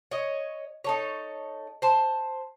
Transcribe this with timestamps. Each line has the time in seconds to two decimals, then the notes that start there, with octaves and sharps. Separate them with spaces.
0.11 C#5 D#5
0.84 D#4 A4 C#5
1.82 C5 A5